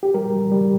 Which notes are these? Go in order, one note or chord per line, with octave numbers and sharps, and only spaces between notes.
G4
G3 A#4
G3
G3